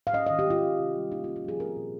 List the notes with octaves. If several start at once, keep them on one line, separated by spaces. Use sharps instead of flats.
F5
C#4 D#5
D#3 D#5
G4
G#3 F4
C#4
C3
G3
A#3 D#4
F4
C#4
F4
F3 G#4
C4 A#4
A#2